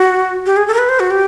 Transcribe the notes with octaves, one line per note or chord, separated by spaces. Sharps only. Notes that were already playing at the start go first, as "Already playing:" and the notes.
Already playing: F#4
G4
G#4
A4
A#4
B4
C5
F#4
G4